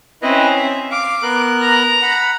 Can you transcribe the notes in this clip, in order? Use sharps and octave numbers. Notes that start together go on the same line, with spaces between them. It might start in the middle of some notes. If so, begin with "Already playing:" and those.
C4 C#4 E4 B4 D#5
E5
F5 D6
B3 A#4 F#6
A#5
F#5 B5